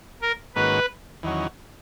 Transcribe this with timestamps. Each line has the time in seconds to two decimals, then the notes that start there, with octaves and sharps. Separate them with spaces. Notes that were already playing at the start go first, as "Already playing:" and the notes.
0.22 A#4
0.55 G#2 D#3 A#3 C#4 F#4 B4
1.23 E2 D#3 F#3 C#4